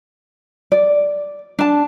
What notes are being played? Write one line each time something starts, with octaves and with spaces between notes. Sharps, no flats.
D5
D4 A5